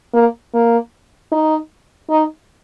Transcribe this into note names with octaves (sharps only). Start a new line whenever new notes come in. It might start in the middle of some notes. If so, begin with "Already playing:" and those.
A#3
A#3
D#4
D#4